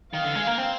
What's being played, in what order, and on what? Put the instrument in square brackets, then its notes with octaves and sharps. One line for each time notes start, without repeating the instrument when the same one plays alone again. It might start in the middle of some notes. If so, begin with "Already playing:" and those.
[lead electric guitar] D#3 [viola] F5
[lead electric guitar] D3
G#3
A#3
C4